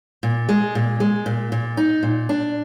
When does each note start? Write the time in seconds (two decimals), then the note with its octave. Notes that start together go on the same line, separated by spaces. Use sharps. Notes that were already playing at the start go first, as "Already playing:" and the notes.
0.23 A#2
0.49 G#3
0.75 A#2
1.00 G#3
1.26 A#2
1.52 A#2
1.77 D#4
2.03 A#2
2.29 D4